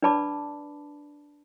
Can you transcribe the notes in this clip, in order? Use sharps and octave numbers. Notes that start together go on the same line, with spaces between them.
D4 B4 D5 A5 B5 D6